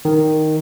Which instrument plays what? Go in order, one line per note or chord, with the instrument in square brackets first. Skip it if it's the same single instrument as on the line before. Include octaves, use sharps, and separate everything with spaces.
[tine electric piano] D#3